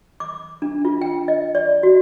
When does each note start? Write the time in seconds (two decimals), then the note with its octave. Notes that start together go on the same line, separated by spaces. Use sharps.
0.20 D6
0.62 D4
0.85 F4
1.02 G5
1.28 D#5
1.55 D5
1.83 F#4